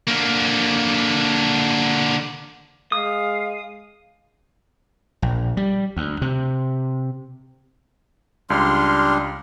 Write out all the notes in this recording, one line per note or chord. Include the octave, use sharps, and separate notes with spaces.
D3 A#3
G#3 F5 D#6
A#1
G3
D2
C3
C#2 G3 D4 C6 F6